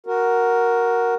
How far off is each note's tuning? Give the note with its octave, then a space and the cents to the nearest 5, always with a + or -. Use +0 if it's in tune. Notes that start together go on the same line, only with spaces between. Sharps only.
F#4 +0 A#4 +0